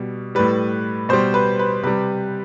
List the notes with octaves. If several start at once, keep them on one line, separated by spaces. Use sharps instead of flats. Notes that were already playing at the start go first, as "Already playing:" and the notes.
Already playing: B2 G3
A2 G3 B4
B2 G3 C5
B4
B4
C3 G3 B4